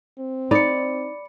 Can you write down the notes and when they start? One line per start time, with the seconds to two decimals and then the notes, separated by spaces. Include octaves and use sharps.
0.19 C4
0.51 D#4 D5 B5 C#7